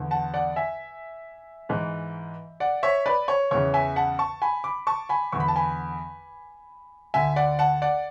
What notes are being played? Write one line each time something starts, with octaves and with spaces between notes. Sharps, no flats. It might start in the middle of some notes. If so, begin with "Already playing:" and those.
Already playing: E2 D3
F#5 A5
D5 F#5
E5 G#5
G#2 E3
D5 F#5
C#5 E5
B4 D5
C#5
E2 C#3 E3 C#5
E5 G#5
F#5 A5
A5 C#6
G#5 B5
B5 D6
A5 C#6
G#5 B5
E2 D3 C#6
B5
A5
G#5 B5
D2 D3 E5 G#5
D5 F#5
F#5 A5
D5 F#5